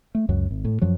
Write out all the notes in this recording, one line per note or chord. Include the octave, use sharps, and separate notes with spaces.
A3
C#2 F#2 F#3
G#1
A2
F#2 F3 F#3